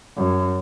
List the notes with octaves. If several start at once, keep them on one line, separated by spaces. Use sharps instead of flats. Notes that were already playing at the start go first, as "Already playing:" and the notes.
F#2